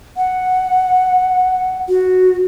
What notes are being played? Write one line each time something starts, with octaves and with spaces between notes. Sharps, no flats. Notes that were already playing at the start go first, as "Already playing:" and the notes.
F#5
F#4